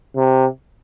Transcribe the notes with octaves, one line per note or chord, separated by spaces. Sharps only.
C3